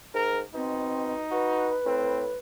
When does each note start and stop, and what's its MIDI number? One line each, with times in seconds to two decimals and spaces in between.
0.14 0.42 44
0.14 0.41 70
0.54 1.23 47
0.54 1.13 60
0.54 1.79 63
1.31 1.69 66
1.31 2.37 71
1.86 2.31 45
1.86 2.24 60